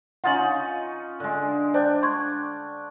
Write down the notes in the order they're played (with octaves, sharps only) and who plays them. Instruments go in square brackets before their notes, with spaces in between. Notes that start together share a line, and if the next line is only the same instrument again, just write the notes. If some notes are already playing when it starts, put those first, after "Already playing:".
[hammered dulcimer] C#4 D#4 F4 [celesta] F#5 A6 F#7
[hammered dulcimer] D3 G#3
[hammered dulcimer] D4 G5 [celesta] C5 D5
[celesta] C6 C#6 G#6